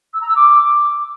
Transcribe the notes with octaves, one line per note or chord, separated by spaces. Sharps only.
E6
A#5
E6
D6